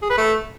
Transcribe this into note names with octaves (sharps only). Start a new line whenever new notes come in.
G#4
B4
A3